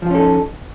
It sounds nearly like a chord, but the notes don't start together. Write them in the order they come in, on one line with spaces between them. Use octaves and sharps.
F3 F4 C#4 A4 D#4